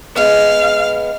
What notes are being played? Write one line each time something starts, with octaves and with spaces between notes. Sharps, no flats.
G#3 B3 F5